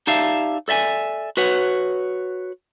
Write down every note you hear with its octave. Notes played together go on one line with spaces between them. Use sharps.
D#4 G4 D5 E5 F5 A5
A4 D5 E5 G5 G#5
F#4 B4 C#5 F#5